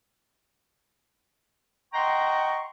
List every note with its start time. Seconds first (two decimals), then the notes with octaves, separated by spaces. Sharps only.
1.93 D#5 F#5 G5 A#5 C6 C#6